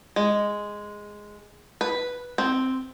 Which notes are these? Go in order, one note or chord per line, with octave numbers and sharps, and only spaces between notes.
G#3
B4
C4